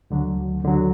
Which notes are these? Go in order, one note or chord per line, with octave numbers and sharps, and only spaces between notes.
D2 D3 F#3
D2 D3 F#3